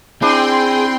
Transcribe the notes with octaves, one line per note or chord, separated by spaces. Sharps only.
C4 D4 E4 G#4 G5 C6